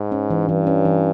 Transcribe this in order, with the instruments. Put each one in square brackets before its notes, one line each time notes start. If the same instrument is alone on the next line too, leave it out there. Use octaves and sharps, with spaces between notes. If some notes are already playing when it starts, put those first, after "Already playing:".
Already playing: [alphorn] G#2
[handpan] C#4
E3
[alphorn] G2 [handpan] E3
[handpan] C#4
E3